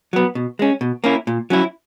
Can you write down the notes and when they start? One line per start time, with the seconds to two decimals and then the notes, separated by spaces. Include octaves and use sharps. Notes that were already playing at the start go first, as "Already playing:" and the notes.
0.13 F#3 B3
0.35 B2
0.59 G#3 C#4
0.81 B2
1.04 A#3 C#4 E4
1.27 A#2
1.50 F#3 C#4 E4